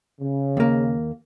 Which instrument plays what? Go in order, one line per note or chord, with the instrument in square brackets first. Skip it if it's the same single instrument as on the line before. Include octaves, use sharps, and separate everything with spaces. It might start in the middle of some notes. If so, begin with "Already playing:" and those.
[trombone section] C#3
[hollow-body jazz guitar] D#2 A#3